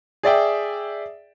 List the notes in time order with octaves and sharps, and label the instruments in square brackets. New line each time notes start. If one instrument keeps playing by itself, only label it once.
[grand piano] G#4 D5 E5 G5